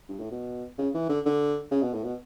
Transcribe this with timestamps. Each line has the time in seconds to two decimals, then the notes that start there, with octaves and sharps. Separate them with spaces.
0.09 G2
0.20 A2
0.32 B2
0.78 C#3
0.94 E3
1.09 D3
1.26 D3
1.71 C#3
1.83 B2
1.94 A2
2.04 B2